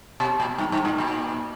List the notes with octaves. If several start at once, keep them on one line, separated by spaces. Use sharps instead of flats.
B2
A#2
G2
G2
A2
A#2